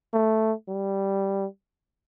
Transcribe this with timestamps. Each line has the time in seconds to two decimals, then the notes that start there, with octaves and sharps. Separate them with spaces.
0.14 A3
0.68 G3